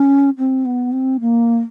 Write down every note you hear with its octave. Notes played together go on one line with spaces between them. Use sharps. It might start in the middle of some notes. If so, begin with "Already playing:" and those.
Already playing: C#4
C4
B3
C4
A#3